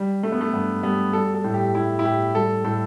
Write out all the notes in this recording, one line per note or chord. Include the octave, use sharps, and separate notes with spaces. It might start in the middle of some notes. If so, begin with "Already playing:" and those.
Already playing: G3
G3 A3
B3
A3
G2 B3
G3 B3
G3 A4
A4
A2
G4
G3 E4
E4
A2 G4
G3 A4
A2 A4